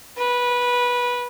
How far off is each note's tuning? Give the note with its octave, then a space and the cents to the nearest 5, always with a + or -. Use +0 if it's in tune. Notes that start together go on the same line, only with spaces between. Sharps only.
B4 -15